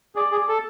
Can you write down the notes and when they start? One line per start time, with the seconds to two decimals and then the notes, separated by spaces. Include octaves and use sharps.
0.16 G#4 D5
0.32 G#4
0.49 A4